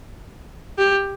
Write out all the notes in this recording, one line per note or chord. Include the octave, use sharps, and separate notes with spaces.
G4